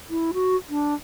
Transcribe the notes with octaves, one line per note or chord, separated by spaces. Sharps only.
E4
F#4
D4